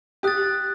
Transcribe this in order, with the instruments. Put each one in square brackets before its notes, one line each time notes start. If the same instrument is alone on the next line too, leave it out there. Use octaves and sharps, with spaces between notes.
[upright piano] G4 [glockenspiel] D#6 F#6 A6